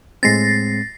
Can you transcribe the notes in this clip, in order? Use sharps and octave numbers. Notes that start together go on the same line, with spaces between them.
A2 G#3 C4 A6 A#6 C7